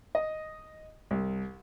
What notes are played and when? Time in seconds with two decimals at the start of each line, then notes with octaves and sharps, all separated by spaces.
0.15 D#5
1.11 C2